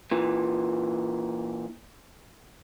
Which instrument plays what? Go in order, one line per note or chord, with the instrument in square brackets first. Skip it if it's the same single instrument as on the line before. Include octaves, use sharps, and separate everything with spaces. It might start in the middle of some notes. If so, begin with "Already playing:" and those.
[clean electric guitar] A#2 E3